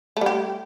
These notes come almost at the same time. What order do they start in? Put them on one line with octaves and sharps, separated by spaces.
A3 G3 G4